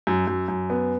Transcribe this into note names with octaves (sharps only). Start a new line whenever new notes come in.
F#2
F#2
F#2
B3